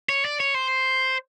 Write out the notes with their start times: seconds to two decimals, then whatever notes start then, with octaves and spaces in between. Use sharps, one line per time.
0.09 C#5
0.25 D5
0.40 C#5
0.54 C5